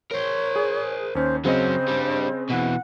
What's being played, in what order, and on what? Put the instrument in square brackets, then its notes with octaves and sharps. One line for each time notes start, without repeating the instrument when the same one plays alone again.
[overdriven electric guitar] A#4 C5 [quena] C#5
[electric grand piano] G#4
[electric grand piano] D#2 C#4 [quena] C5
[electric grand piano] C#3 C4 D#5 [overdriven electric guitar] F#3 C#4 [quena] C5
[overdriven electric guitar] G3 D4
[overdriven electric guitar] B2 E3 [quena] F#5